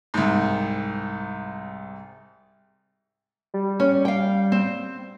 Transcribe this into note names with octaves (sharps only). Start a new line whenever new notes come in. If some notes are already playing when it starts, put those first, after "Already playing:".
C2 G#2
G3
C#4
F5 G5
C4